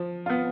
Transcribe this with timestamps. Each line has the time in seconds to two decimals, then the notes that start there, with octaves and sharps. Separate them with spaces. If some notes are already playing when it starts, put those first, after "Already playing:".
Already playing: F3
0.26 B3 F4